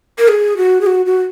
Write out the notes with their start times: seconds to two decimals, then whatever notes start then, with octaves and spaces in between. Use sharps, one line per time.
0.18 A#4
0.28 G#4
0.57 F#4
0.81 G#4
0.87 F#4
1.06 F#4